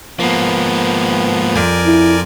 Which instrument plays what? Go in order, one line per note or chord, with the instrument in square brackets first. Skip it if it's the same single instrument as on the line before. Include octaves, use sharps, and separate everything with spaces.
[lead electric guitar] G#2 A#3 [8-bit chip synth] F3 B3
[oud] F2 [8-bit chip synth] A#4 D5 G#5
[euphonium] E4